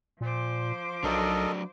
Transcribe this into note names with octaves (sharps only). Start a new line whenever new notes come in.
A#2 F3 C5 D6
B1 F#3 D4 A4 A#4 D#5